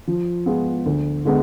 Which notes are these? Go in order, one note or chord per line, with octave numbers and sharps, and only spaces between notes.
F3
G#3 B3 F4 G#4
D2
D3 G#3 B3